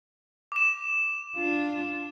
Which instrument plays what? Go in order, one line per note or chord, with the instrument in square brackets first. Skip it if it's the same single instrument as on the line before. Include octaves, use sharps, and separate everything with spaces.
[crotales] D6 E7
[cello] D4 F4